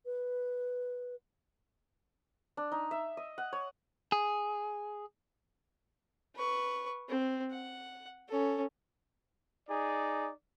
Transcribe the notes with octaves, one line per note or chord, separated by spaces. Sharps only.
B4
D4
D#4
E5
D#5
F#5
C#5
G#4
B4 C#6
C4
F#5
C#4 A4
D#4 G#4 D5